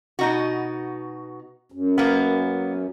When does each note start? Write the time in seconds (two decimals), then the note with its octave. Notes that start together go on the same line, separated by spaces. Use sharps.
0.19 B2 D#4 F#4
1.72 F#2
1.98 A#3 B3